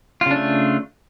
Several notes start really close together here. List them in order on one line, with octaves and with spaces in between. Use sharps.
F4 C#3 D4 A3